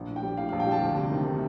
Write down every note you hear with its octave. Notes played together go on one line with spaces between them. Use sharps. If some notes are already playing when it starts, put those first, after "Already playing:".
Already playing: A#1
A2
G5
G3
A2 F5
F5
A#1
G5
G3 A5
D2
C3
D#3
A3